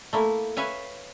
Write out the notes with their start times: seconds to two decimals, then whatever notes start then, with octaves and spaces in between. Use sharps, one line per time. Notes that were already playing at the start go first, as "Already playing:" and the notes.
0.13 A3 A#3 E4
0.57 B4 C#5 E5 F5 G#5